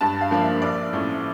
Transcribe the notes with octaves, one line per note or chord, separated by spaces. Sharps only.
G2 A5
F5
F3 A#3 D4
E5
A#1 D5
A2 F3 C#4